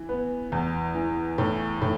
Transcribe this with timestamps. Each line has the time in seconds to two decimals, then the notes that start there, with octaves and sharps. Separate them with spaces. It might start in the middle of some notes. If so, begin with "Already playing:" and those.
Already playing: E3
0.09 B3
0.52 E2
0.95 E3
1.38 A2
1.82 A2